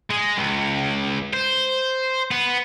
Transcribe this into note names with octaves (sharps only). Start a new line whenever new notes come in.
G#3
C#2
C5
B3